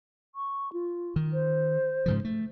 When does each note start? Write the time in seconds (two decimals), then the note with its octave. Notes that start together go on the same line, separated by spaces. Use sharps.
0.35 C#6
0.73 F4
1.16 D#3
1.33 C5
2.06 G#2 C#3 F3
2.25 A3